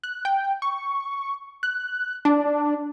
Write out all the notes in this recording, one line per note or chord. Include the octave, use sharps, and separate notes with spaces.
F#6
G5
C#6
F#6
D4